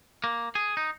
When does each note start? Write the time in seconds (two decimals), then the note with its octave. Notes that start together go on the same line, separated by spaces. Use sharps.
0.24 A#3
0.55 G#4
0.77 D#4